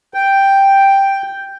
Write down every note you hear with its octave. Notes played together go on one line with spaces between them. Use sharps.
G5